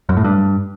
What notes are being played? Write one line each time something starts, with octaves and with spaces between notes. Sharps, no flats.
F#2
A2
G2